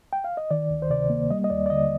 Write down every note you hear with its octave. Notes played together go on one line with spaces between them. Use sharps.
G5
F5
D#5
D#3 D5
D2
C5
C3 D5
A#3
G3 D#5
D#5
D#2 D5
D5
D3 D#5